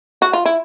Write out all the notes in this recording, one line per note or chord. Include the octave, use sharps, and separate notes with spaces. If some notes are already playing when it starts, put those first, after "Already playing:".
F#4
F4
E4